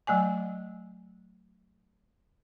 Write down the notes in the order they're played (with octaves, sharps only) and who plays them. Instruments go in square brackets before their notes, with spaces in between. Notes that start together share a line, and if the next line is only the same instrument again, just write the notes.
[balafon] F#3 A3 D5 G#5